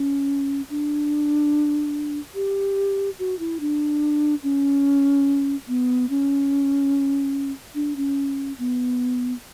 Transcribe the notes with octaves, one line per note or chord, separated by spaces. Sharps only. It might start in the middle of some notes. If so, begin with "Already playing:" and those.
Already playing: C#4
D4
G4
F#4
E4
D4
C#4
B3
C#4
D4
C#4
B3